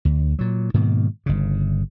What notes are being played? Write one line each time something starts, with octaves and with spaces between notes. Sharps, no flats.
D2
A#2 F#3
G#2 B2 D#3 A#3
G1 C#3